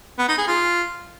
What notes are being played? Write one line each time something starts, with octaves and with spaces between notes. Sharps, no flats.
B3
D#4
G#4
F4